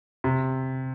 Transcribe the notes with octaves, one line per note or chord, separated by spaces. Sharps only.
C3